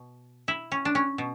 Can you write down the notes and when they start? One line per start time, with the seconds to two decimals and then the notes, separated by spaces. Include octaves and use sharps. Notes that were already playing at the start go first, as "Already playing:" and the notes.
Already playing: B2
0.48 E4
0.72 C#4
0.85 D4
0.95 C#4
1.18 B2